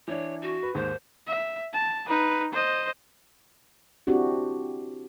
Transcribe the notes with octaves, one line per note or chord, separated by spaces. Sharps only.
E3 D4 C#5
F#4
B4
D#2 G#2 C5
E5
A5
D#4 B4
C5 D#5
C4 D4 E4 F#4 G4